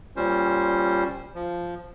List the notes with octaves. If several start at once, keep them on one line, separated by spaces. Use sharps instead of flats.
A#2 G3 C#4 C5
F3